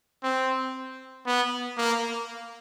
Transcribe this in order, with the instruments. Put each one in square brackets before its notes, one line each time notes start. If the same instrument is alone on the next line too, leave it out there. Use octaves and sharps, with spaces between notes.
[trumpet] C4
B3
A#3